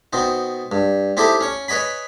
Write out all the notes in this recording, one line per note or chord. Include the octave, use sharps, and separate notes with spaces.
B2 C4 D#4
G2
C4 D#4 E4 G4 A4
C#4 C#6
B4 C#5 D#5 G#5 B5